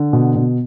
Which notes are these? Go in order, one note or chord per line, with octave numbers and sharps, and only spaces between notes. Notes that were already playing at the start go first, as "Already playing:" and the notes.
Already playing: D3
B2
B2